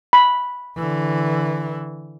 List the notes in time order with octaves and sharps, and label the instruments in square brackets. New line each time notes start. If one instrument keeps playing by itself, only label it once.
[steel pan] B5
[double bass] D3 E3